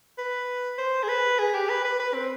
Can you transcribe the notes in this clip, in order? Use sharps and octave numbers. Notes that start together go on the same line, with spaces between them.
B4
C5
G#4
B4
G#4
G4
B4
B4
B4
C4